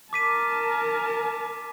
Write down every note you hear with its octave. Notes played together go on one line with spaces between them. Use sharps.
A#4 A5 D6 B6 D#7